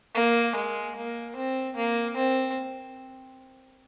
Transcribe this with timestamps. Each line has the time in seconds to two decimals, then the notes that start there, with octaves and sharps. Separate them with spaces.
0.15 A#3
0.55 G#3
0.96 A#3
1.36 C4
1.76 A#3
2.16 C4